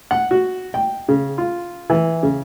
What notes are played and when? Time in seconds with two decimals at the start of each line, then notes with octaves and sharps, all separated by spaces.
0.11 F#5
0.31 F#4
0.74 G5
1.09 C#3
1.38 F4
1.90 E3
2.23 C#3